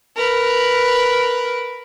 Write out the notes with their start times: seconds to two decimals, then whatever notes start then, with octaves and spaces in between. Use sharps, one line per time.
0.16 A#4 B4